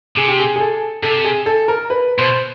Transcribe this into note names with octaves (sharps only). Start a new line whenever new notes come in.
C3 G#4
G4
G#4
G#4
A4
C3 A4
G#4
A4
A#4
B4
B2 C5